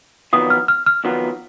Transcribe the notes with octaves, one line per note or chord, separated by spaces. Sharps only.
F2 D#3 F#3 B3 F4 D#6
F6
F6
F6
F2 D#3 F#3 B3 F4